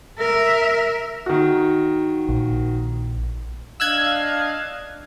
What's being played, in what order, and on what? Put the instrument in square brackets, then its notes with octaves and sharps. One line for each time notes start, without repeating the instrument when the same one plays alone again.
[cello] A#4 E5
[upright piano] D#3 F#4
[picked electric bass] A#1
[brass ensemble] D4 D#5 F5 [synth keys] E6 F#6 G#6